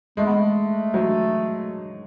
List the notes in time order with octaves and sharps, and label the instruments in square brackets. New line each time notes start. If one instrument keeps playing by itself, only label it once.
[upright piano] G#3 [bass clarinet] A3
[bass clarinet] B3
A3
[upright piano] F#3